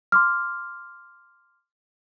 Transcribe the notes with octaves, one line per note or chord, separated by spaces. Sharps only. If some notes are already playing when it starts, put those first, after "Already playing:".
C6 D6 F6